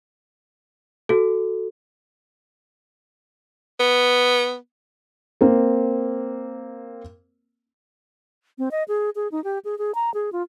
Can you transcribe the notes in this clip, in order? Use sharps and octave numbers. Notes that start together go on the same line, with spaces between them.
F#4 A4
B3
A#3 C4
C4
D#5
G#4
G#4
D#4
G4
G#4
G#4
A#5
G#4
F4